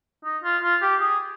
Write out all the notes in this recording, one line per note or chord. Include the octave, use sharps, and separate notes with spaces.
D#4
F4
F4
G4
G#4